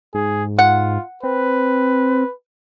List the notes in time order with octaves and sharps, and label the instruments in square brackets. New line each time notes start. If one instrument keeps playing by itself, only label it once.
[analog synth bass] G#2 [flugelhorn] G#4
[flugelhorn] F4 [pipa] F#5
[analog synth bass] C4 [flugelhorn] B4